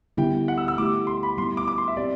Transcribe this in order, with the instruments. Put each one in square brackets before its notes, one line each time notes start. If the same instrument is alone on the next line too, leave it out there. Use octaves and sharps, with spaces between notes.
[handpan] D3 G3 B3 E4 G4 [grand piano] G5
[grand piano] F#5
E6
E6
[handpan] A3 E4 G4 [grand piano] D6
[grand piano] C6
B5
[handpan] G3 B3 E4 [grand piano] C6
[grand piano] D6
D6
C6
E5
[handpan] C4 G4 [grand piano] D5